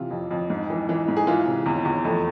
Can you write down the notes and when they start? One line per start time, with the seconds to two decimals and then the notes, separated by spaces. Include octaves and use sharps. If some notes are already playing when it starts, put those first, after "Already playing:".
Already playing: C3 E3 F4
0.11 F2
0.31 F2
0.50 G#2
0.70 E3
0.89 E3
1.08 G#2
1.17 G#4
1.27 E3 F4
1.46 C3
1.66 E2
1.85 E2
2.05 F2 A3